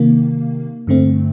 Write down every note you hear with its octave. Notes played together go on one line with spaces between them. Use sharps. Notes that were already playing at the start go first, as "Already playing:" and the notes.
Already playing: C3 D#3 A#3
G2 D3 A3 C4